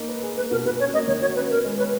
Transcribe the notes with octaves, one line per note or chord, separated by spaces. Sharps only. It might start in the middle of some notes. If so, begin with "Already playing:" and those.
Already playing: A#3 D#4
B4
G#4
A#3 B4
B2 A#4
B2 B4
C#4 C#5
A#3 D#5
D#3 C#5
F#4 C#5
C#4 B4
B3 A#4
G#3
B4 C#5